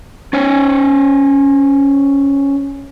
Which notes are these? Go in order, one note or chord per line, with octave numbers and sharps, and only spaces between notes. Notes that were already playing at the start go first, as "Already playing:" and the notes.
C#4 C5 C#5